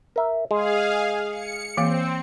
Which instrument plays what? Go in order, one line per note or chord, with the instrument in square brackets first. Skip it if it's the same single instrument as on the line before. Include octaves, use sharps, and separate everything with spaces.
[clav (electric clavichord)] A#4 E5
[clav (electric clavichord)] G#3 [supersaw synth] G#4 F5
[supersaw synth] C#7
[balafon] E3 A#3 F5 [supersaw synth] C4